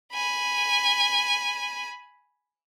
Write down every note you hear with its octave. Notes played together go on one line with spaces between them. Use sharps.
G#5 B5